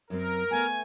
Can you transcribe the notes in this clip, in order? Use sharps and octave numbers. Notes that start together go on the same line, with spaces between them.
F#2 F#3 C4 A#4
A3 B3 G#5